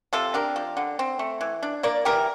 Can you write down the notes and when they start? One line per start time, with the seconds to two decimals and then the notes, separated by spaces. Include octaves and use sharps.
0.13 C3 F4 A4
0.34 D4 G4 A#4
0.56 F3
0.77 D3
0.99 C4
1.19 A3
1.41 E3
1.63 D4
1.83 A#3 A#4 D5
2.05 E3 G4 A#4